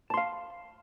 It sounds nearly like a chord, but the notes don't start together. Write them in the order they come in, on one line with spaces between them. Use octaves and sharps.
A5 C6 F5